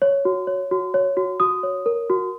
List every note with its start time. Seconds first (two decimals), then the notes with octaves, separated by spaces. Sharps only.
0.02 C#5
0.25 F#4
0.47 C#5
0.71 F#4
0.94 C#5
1.17 F#4
1.40 F#4 D#6
1.63 C#5
1.86 A#4
2.10 F#4